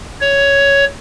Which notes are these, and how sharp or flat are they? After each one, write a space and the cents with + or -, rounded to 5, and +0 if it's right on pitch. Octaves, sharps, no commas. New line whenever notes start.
C#5 +10